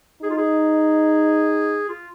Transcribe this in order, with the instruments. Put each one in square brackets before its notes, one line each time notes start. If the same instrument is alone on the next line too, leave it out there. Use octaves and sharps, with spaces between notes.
[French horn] D#4 [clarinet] G#4
[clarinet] F4
G#4
F4